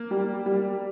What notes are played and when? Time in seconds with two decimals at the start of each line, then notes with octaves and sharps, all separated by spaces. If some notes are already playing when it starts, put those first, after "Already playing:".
Already playing: A#3
0.11 G3
0.46 G3